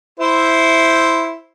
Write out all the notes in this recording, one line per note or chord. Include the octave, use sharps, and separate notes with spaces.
E4 C5 E5